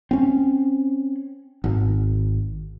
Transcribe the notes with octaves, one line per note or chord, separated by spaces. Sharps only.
C4 C#4
G#1